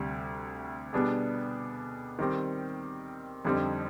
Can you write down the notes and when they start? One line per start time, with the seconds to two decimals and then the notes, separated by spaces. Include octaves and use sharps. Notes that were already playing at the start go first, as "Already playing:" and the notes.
Already playing: D2 C3 G3
0.93 B2 G3 B3 D4 G#4
2.19 D#3 G3 C4 G4
3.45 F2 D3 G3 C4 D#4